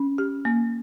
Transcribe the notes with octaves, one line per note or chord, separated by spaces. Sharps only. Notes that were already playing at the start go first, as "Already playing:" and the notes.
Already playing: C#4
G4
A#3